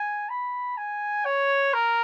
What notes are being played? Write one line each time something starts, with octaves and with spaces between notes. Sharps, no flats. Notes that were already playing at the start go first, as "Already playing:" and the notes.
Already playing: G#5
B5
G#5
C#5
A#4